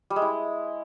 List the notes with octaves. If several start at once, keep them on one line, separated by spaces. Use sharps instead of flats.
G3
G#3
E4